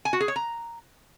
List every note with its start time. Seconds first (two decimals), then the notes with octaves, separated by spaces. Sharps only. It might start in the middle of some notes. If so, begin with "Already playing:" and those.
0.05 G#5
0.13 F#4
0.20 G#4
0.28 C#5
0.36 A#5